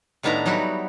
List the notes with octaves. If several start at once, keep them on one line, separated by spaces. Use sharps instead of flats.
A2 D#3 B3 D4 E4 A#5
F#3 G3 D#4 E4 F#4